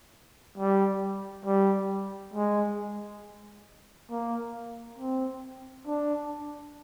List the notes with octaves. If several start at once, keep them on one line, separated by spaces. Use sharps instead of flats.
G3
G3
G#3
A#3
C4
D4